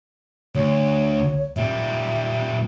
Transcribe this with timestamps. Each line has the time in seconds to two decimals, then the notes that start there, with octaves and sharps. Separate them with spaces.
0.55 D2 C#5
1.57 A#2 G3 E5